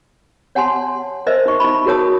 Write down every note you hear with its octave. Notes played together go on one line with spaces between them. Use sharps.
C#5 F#5 G#5 A5 C6
A#4 C5 D#5 E5
D#4 C#6
D#4 B5
F#4 G#4 A#4 C#5 A5 D#6